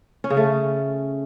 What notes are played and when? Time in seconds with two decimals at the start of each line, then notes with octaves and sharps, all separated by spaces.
0.24 C#4
0.30 C#3
0.37 A3